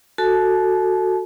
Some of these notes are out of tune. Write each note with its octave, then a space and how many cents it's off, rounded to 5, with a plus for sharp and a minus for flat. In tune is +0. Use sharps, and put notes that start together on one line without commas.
F#4 +0 A4 +15 A5 -35